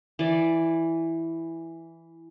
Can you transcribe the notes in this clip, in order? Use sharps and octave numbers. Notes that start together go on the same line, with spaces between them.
E3 D5